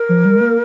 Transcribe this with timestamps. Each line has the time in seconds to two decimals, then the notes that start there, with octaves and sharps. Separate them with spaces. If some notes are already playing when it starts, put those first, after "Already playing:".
Already playing: A#4
0.09 F3
0.25 G3
0.35 G#3
0.41 A#3